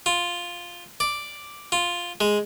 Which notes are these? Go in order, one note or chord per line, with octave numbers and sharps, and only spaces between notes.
F4
D5
F4
G#3